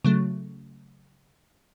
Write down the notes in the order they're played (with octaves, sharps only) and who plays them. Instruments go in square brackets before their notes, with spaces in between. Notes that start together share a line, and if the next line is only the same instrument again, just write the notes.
[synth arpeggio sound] C#3 F#3 A3